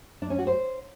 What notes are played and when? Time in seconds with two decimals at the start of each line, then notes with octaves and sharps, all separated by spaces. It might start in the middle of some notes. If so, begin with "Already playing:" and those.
0.22 D4
0.30 C#4
0.39 F#4
0.47 C5